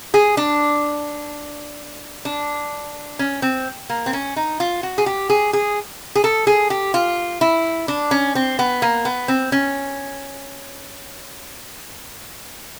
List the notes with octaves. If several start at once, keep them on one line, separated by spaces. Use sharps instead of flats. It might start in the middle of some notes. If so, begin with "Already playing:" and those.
G#4
D4
D4
C#4
C4
A#3
C4
C#4
D#4
F4
F#4
G#4
G4
G#4
G#4
G#4
A4
G#4
G4
F4
E4
D4
C#4
C4
B3
A#3
B3
C4
C#4